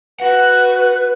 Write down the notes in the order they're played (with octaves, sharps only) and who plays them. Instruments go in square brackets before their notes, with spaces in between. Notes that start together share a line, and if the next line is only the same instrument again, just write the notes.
[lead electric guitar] F#4 F#5 [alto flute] B4